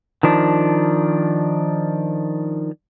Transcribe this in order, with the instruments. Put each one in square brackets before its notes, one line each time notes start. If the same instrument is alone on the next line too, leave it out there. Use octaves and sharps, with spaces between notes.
[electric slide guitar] D#3 F3 D4